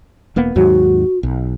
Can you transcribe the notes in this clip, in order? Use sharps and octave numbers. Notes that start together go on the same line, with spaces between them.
E1 A#3 B3
D#2 G#2 F#3 F#4
B1